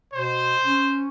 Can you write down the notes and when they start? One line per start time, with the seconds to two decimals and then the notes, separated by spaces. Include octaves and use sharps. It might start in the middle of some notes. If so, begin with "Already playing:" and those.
0.14 B2 C5
0.64 C#4